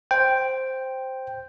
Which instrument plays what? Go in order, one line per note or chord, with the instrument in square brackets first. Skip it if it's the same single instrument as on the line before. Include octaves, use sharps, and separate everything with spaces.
[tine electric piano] C5 G5